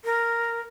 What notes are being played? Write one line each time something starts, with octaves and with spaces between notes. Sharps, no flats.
A#4